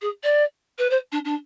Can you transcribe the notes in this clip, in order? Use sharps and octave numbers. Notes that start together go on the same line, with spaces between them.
G#4
D5
B4
C5
D4
D4